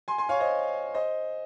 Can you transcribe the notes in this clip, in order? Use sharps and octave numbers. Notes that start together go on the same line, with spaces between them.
G#5 C6
G#5 C6
C#5 F5
C5 D#5
C5 D#5